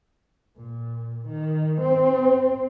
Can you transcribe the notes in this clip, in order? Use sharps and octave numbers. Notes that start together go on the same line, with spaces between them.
A#2
D#3
C4